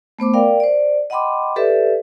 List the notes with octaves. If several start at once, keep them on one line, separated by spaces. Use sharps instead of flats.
A3 B3 C5 D6
A#4 D5 F5 G5
C5 D5
D#5 F#5 G5 B5 C6 D6
G4 A4 B4 D5 E5